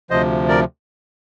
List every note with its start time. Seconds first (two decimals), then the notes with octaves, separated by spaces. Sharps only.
0.10 D2 C3 F3 C5 D#5
0.48 A#4 D5